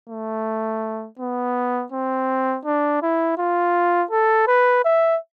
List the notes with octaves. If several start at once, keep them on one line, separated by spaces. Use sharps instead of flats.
A3
B3
C4
D4
E4
F4
A4
B4
E5